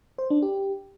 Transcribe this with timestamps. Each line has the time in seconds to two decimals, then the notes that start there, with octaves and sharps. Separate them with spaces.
0.18 C5
0.30 D4
0.42 G4